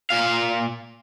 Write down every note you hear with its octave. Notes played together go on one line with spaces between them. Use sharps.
A#2 F5